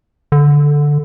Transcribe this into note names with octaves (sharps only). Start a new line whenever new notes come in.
D3